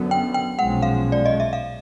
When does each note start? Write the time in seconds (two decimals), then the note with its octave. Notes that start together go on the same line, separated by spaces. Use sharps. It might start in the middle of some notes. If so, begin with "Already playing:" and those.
Already playing: F#2 D3 F#3 B3
0.11 G5
0.34 G5
0.58 B1 A#2 F3 G#3 C#4 F#5
0.82 F5
1.12 D5
1.26 D#5
1.40 E5
1.53 F5